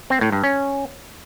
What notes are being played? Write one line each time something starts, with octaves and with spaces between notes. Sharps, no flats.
C4
A2
G2
C#4